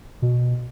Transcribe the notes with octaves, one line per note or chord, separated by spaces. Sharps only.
B2